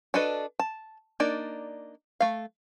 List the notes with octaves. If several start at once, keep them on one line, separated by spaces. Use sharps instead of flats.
D4 F#4 A4 B4 D#5
A5
A#3 D4 D#4 D5
A3 F5